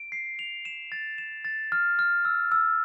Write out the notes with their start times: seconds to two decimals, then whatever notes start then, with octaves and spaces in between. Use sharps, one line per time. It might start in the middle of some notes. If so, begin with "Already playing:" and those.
Already playing: D7
0.12 C7
0.39 F7
0.65 E7
0.92 A6
1.18 E7
1.45 A6
1.72 F6
1.99 F6
2.25 E6
2.52 E6